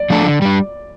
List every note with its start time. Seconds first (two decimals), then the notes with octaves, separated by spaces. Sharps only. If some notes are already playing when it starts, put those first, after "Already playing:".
Already playing: D5
0.10 F3 A3 D4 A4
0.25 D3
0.42 G3 D4